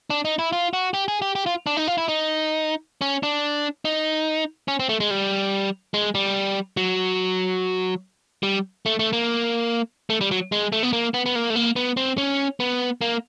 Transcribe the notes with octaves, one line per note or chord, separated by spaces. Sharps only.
D4
D#4
E4
F4
F#4
G4
G#4
G4
G4
F4
D4
D#4
F4
E4
D#4
C#4
D4
D#4
C#4
C4
A3
G#3
G3
G#3
G3
F#3
G3
A3
A3
A#3
A3
G3
F#3
G#3
A3
B3
A#3
B3
B3
A#3
A3
A#3
B3
C4
C#4
B3
A#3